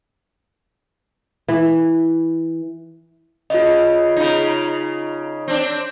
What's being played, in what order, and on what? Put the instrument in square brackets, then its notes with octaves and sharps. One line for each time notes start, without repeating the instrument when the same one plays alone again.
[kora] E3
[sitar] C#3 [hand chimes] F4 D#5
[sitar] C#3 D#4
C4 D4